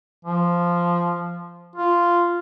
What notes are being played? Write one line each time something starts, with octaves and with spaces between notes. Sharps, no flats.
F3
F4